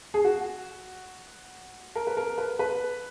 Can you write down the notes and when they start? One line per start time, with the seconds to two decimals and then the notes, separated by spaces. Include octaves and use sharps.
0.14 G#4
0.25 F#4
1.95 A#4
2.07 B4
2.17 A#4
2.38 B4
2.59 B4